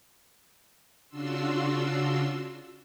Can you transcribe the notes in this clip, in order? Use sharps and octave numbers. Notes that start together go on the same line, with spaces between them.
C#3 D4 F4 F#4 C6 E6